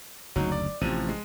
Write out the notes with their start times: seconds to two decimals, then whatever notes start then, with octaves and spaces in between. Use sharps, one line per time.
0.36 F#1 D2 F#3 D#4
0.52 D5
0.81 A1 C3 F3 D#7
1.09 G#3